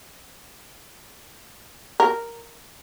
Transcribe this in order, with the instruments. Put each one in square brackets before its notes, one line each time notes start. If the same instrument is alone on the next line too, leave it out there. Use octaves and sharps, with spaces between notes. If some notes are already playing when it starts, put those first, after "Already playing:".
[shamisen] A#4